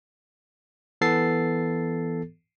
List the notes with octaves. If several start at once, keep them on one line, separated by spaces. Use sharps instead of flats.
E3 B3 A4 A6 C7